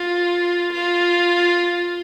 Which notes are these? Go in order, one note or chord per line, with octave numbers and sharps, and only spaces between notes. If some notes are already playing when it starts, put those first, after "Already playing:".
Already playing: F4
F4